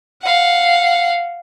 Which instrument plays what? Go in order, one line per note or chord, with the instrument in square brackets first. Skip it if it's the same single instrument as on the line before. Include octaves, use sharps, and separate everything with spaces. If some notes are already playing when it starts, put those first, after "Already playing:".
[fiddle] F5 F#5